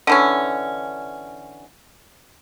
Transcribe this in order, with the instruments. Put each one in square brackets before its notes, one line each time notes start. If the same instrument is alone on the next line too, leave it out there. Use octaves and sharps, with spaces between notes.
[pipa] D3 E3 C#4